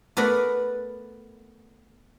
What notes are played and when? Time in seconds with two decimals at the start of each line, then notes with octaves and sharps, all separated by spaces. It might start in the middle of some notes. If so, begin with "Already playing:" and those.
0.17 A3 B3 A#4 B4 D5